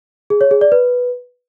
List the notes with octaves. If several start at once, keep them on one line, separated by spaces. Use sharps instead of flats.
G#4
C#5
G#4
D5
B4